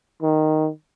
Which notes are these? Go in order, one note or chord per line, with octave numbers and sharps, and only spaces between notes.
D#3